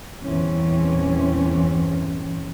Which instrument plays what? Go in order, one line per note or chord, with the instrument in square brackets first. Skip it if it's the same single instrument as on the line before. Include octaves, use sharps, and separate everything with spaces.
[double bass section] E2 G2 A#2 E3 C4 C#4